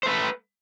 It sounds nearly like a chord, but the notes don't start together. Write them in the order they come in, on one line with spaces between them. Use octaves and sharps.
C5 A3 B4